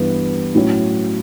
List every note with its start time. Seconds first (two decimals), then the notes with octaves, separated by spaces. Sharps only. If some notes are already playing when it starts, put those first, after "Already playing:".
Already playing: G2 E3 G3 B3
0.55 A2 F#3 C#4